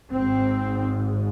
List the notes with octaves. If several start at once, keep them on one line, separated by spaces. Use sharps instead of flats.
G#1 G#2 C4